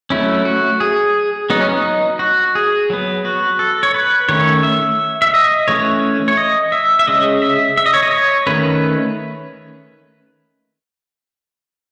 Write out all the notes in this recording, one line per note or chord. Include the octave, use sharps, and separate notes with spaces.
F#3 A3 C#4 E4
F#4
G#4
F#3 B3 D#4
C#4
D#4
F#4
G#4
F#3 B3
F#4
A4
C#5
B4
D#3 A3 C#4 C#5
E5
E5
D#5
E3 A3 C#4 C#5
C#5
D#5
E5
E5
C#3 G#3 C#4 D#5
E5
E5
D#5
C#5
D#5
C#5
D#3 A3 C#4 B4